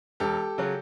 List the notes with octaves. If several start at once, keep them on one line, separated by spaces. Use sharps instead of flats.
E1 G4 A4
C#3 F#3